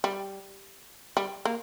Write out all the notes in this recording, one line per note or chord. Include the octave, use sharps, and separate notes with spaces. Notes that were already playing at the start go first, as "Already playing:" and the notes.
G3
G3
A#3